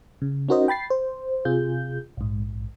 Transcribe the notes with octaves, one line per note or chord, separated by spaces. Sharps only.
C#3
C#4 D#4 F#4 A#4 C5 D#5
G5 B5 A6 C7
C5
C3 F4 G#4 G6
A#1 G#2